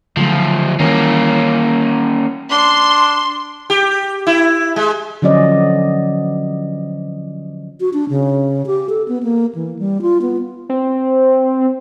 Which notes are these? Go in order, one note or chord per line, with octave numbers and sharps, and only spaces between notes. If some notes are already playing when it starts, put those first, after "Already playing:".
C#2 D3 F3 F#3 A3
D#3 E3 G3 A#3 C#4
D4 C6
G4
E4
G#3
D3 F3 F#3 C#4 D5 D#5
F#4
D4
C#3
G4
A4
B3
A#3
E3
G3
F4
B3
C4